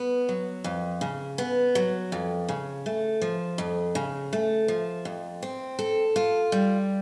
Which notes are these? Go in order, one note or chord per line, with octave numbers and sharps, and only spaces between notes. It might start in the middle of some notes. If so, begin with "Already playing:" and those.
Already playing: B3
F#3
F2
C#3
B3
F#3
F2
C#3
A3
F3
F2
C#3
A3
F3
F2
C4
A4
F4
G3